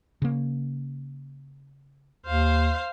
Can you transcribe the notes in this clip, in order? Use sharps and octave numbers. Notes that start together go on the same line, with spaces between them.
C#3 A#3
D#2 C5 F5